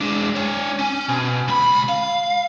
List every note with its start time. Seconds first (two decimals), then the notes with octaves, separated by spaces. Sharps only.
0.01 G#3 D4
0.36 D4 C#5
0.79 C#4 G#5
1.09 B2
1.48 C#2 B5
1.89 F5